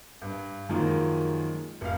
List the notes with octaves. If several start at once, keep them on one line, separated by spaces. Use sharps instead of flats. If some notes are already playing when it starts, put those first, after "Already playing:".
G2
F#2 D#3 F3 G#3 A#3
F1 F5